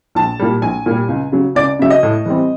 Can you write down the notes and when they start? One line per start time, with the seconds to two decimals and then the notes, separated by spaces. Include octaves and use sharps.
0.15 A#1 A5
0.40 A#2 G3
0.62 A#1 G#5
0.86 A#2 G3
1.08 C#2
1.32 C#3 F#3
1.55 C#2 D5
1.79 C#3 F#3 E5
1.90 D#5
2.03 A2
2.25 E3 G3 C4